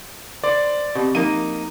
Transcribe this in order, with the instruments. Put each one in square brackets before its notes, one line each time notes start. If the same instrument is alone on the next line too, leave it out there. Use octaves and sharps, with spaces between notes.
[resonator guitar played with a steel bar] C5 [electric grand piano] D5
[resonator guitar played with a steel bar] B2 [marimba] C4 G4 D#5
[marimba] F3 [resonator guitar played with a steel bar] A#3 D#4 [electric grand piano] D#7